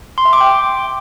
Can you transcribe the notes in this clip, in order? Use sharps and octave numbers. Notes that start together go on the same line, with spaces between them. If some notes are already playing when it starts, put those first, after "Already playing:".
C6
E5
D6
G5